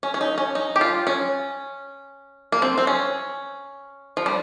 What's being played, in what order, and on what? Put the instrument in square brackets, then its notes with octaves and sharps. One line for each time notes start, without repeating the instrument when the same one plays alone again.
[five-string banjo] C#4
C#4
D#4
C#4
D#4
G4
F4
C#4
A#3
C4
C4
C#4
F3
G3